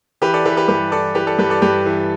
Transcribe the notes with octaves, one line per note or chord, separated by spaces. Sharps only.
E3 G4 B4
A4 D5
E3 G4 B4
G4 B4
G2 G4 B4
E3 A4 D5
E3 G4 B4
A4 D5
G2 G4 B4
A4 D5
G2 G4 B4
E3